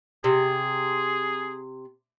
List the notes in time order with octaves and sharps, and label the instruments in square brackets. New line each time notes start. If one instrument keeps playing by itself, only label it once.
[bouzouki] C3 [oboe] G#4